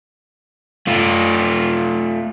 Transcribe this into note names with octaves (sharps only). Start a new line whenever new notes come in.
A3 F4